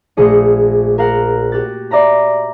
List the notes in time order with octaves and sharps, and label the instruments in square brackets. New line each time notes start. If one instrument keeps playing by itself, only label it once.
[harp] A#1 A3 G#4 D#5 C#7
A#4 F5 F#5
F#4 G4 F#6 A6
D5 E5 A#5 B5